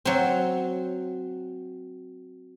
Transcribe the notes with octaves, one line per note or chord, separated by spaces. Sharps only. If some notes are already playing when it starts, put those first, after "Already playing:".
F#3 C4